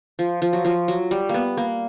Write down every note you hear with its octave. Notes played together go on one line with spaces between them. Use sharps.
F3
F3
F#3
F3
F#3
G3
A#3 B3
A#3